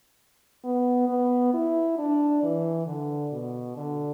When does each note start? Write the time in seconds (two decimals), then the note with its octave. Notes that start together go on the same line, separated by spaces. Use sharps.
0.64 B3
1.09 B3
1.54 E4
1.98 D4
2.43 E3
2.87 D3
3.32 B2
3.76 D3